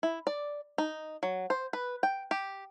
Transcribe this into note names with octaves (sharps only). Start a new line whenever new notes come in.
E4
D5
D#4
F#3
C5
B4
G5
G4